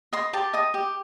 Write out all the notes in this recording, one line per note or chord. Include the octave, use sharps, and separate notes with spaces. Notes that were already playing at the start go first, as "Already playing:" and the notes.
D#5 C6
G4 A5
D#5 D#6
G4